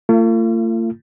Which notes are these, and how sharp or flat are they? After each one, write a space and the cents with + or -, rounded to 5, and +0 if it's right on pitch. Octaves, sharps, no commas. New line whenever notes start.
A3 +45 F4 -30